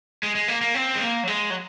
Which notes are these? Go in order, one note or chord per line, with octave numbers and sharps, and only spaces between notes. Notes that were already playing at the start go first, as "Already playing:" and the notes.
G#3
G#3
A#3
A#3
C4
G#3
A#3
F#3
G#3
F#3